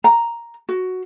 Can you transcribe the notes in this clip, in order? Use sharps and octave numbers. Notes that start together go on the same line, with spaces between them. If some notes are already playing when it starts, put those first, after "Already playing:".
A#5
F#4